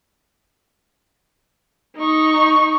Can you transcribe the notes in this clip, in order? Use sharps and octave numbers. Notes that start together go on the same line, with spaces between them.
D#4 C#6